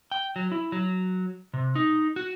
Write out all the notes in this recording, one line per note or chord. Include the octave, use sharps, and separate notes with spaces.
G5
F#3
E4
F#3
C3
D#4
F#4